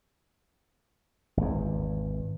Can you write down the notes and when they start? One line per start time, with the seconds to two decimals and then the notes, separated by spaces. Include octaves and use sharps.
1.37 G#1 E2